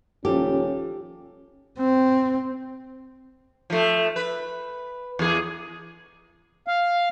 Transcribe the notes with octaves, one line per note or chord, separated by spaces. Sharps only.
D#1 F3 C#4 G4 A4
C4
F3 A3
B4
E2 G#4
F5